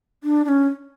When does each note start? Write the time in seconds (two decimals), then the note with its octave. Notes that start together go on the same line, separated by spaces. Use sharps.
0.24 D4
0.45 D4
0.48 C#4